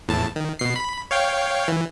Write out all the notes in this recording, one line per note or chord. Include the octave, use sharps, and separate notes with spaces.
E2 A2 A5
D#3
B2 C7
B5
C#5 F5 G5
E3